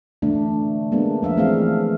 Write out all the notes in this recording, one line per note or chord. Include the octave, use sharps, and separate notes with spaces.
D3 E3 A3 D4
G#3 A#3 B3 D4
F3 E5 F5
E3 A3 C4 G#4 F5